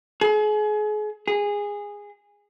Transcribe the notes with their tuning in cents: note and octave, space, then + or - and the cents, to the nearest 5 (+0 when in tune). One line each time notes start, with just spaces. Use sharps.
G#4 +35
G#4 -15